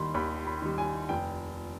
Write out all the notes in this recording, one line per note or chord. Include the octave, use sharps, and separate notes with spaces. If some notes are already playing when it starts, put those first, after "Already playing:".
Already playing: D#2 D#3 G3 B5 C6
D#2 B5
B5
D#3 G3
G#5
F1 G5